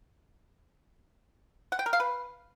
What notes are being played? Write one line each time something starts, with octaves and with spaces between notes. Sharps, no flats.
F#5
G5
A#4
F5
B4